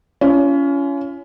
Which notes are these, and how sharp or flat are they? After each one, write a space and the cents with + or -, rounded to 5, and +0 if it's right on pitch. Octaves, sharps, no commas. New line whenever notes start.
C#4 +25 F4 -40